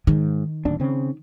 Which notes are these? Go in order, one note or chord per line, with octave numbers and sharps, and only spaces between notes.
G#2 D#3
D1 D#2 D4
C#3 C4